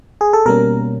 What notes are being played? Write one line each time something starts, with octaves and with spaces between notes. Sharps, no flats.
G#4
A4
B2 G3 A#3 C#4 A#4